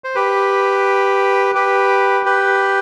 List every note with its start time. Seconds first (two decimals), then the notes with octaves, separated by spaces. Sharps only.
0.04 C5
0.15 G4 B4
1.55 G4 B4
2.25 G4 B4